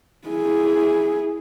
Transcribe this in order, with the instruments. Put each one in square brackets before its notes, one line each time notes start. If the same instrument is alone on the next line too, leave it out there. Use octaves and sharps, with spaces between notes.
[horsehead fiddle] E4 G#4